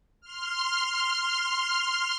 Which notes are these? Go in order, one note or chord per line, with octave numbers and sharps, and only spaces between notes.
C6 F6